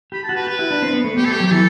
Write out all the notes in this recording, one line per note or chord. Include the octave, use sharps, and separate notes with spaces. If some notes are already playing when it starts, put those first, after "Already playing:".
G4 B5
A5
F#4
B4
G4 B4
E4
D4
C4
B3
A3
B3 G4
A4
A3 G4
F#3
G4
E3 A4